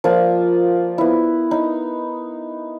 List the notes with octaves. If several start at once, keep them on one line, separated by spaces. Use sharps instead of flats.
F3 A#3 F4 D5
B3 E4
D#4